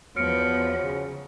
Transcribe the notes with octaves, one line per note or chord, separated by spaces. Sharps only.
E2 F3 F#3 B3 F6 C#7 D7
C#3